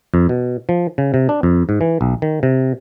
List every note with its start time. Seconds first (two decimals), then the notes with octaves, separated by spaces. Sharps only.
0.14 F2
0.29 B2
0.69 F3
0.98 C#3
1.14 C3
1.29 D4
1.43 F2
1.69 G#2
1.81 E3
2.01 B1
2.22 D#3
2.43 C3